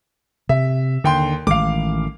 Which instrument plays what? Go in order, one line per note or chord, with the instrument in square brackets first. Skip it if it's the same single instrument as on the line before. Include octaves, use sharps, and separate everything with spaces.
[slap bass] C3 [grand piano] E5
[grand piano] D#2 G5 C6 [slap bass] D3
[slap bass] A1 D#3 G#3 [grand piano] F5 D6